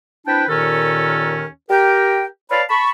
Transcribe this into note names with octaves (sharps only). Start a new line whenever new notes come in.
C4 D4 E4 B4 G5 A5
D#2 A#2 D#3 C#4 A4 A#4
G4 A#4 G5
B4 C#5 D5 F5 A5 B5
A5 B5 C#6